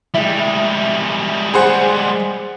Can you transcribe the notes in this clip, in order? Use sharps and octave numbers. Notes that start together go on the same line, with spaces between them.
G3 G#3 E4
G#4 C5 F#5